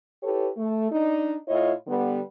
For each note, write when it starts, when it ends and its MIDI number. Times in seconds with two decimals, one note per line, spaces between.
0.23 0.49 64
0.23 0.49 67
0.23 0.49 69
0.23 0.49 71
0.23 0.49 73
0.57 0.90 57
0.91 1.36 62
0.91 1.36 63
1.48 1.73 45
1.48 1.73 64
1.48 1.73 65
1.48 1.73 73
1.48 1.73 75
1.88 2.20 50
1.88 2.20 55
1.88 2.20 59